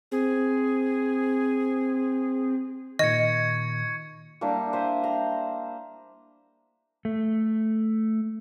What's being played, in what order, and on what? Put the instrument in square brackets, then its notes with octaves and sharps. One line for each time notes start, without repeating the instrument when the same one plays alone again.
[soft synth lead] C4 [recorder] G#4
[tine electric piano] A#2 D#3 [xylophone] D#5 [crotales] C#6 G#6 C#7
[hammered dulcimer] G3 A#3 D4 E4
C5 E5 G#5
A#5
[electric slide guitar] A3